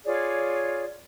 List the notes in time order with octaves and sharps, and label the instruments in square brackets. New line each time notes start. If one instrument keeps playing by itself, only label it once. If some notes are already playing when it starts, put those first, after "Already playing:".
[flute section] F4 G#4 C#5 D5